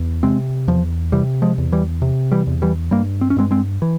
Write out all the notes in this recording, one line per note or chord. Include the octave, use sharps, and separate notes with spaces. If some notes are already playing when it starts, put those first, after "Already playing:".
Already playing: E2
C3 G#3 C4
E2 F3
C3 E3 G3
F3 G#3
E2
E3 G3
C3
E3 G3
E2
E3 G3
G2 G3 A#3
C4
C#4
G2 G#3 C4
G#3 C4
E3